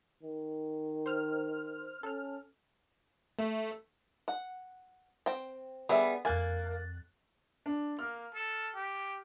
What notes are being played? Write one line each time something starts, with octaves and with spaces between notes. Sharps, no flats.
D#3
C5 F6
C#4 A4 F6
A3
F#5
C4 G5
G3 B3 G#4 E5
F2 A#3 G#5 F#6 A6
D4
A#3 F6
A4
G4